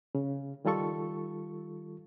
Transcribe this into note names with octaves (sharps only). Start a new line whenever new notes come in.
C#3
D#3 G3 F4 A4 C#6